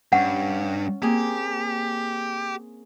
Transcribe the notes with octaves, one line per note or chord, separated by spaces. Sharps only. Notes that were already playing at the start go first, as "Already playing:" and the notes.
G2 C#4 F#5
A#3 C4 G4 G#4